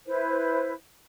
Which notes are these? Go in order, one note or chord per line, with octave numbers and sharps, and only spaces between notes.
E4 B4 C5